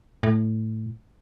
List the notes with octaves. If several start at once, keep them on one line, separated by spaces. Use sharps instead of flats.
A2